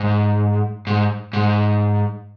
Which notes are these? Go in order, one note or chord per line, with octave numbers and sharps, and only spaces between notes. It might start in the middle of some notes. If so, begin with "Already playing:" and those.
Already playing: G#2
G#2
G#2